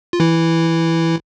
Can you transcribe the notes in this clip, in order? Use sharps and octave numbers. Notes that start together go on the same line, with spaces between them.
F4
E3 E4